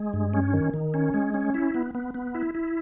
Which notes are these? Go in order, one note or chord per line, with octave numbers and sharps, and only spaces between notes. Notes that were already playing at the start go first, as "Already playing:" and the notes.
Already playing: G#3
G2
C#4
D#3
D#3
C#4
G#3
C#4
E4
B3
B3
B3
E4
E4